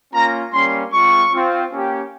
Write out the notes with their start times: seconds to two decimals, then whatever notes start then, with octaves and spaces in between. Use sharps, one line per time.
0.13 A#3 C#4 F4 A#5
0.53 G3 A#3 C#4 C6
0.92 G#3 C4 F4 C#6
1.32 C4 F4
1.71 A#3 C#4 G4